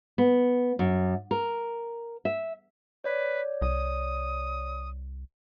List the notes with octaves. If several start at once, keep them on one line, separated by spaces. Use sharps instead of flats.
B3
F#2
A#4
E5
B4 C#5 D5
C2 D#6